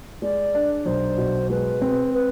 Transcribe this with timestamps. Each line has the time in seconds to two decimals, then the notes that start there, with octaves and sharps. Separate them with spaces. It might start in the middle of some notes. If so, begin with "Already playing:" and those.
0.22 G#3 D5
0.55 D4
0.85 B1 C5
1.18 B2
1.50 G#3 B4
1.82 C4
2.14 B4